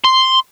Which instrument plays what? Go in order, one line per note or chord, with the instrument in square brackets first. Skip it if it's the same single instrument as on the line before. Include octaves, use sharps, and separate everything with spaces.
[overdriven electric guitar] C6